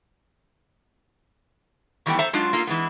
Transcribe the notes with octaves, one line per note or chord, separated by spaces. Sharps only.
D#3 E3 G3 A3 B3 G5
A4 C5 E5 A#5
F#3 G#3 D4 F4
A#3 F4 A4
E3 G#3 B3